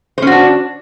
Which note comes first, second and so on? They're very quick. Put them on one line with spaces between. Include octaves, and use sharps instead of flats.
C5 C#4 F#4 D4